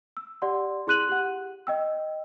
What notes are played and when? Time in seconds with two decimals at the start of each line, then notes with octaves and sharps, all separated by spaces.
0.17 E6
0.42 G4 D5 F#5 C6
0.87 E4 G#4 C6 F#6 D#7 F#7
1.09 G4 F#5
1.67 D#5 G5 E6